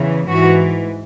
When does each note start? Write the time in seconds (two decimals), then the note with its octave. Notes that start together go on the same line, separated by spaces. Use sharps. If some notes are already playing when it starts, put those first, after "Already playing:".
Already playing: E2 C#3 E3
0.29 G#2 E3 F#4